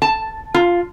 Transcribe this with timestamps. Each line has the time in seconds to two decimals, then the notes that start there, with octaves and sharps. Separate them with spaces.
0.02 A5
0.54 F4